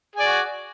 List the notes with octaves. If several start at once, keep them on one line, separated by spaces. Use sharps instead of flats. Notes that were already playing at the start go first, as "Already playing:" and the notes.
F#4 G#4 D5